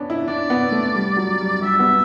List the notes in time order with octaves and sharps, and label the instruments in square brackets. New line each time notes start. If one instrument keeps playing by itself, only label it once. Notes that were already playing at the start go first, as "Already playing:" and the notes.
Already playing: [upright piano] B3 C#4 D4
E4
[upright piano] D4 [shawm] D5
[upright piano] B3
A3
G3
F#3
G3
[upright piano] G3 [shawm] E5
[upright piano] B3